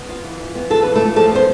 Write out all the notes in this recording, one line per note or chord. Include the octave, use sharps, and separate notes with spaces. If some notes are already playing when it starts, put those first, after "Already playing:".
Already playing: B3
F4
E3
E3
B3
F4 A4
E3 B4
A3 A4
E3
F3 A3 A4
B3 C5